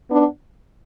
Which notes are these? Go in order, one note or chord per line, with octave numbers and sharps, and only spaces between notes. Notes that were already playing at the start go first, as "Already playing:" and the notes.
B3 D4